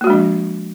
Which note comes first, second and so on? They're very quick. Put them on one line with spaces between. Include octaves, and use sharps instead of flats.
A#3 F#4 G#3 D4 F3